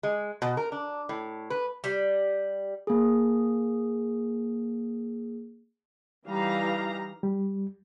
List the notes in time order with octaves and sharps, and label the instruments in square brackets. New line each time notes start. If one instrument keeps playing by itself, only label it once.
[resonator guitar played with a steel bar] G#3
B2
A#4
D4
A2
B4
[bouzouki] G3
[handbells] A#3 G#4
[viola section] E3 G3 D#4 F5 A#5
[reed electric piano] G3